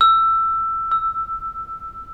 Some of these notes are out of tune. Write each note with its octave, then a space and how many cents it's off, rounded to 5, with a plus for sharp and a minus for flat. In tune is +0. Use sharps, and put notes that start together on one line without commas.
E6 +15
E6 +5